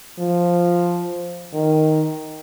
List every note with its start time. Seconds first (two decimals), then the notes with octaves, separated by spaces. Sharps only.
0.19 F3
1.54 D#3